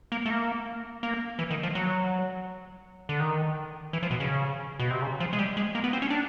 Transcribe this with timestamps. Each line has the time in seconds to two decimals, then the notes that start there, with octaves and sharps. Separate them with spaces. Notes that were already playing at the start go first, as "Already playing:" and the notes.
0.12 A#3
0.26 A3
0.30 A#3
1.03 A#3
1.39 E3
1.51 D#3
1.63 F3
1.75 F#3
3.09 D3
3.20 D#3
3.93 E3
4.03 F3
4.11 B2
4.20 C#3
4.80 B2
4.91 C3
5.02 C#3
5.20 F3
5.33 G#3
5.39 G3
5.57 G#3
5.75 A#3
5.84 B3
5.93 C4
6.02 C#4
6.10 D4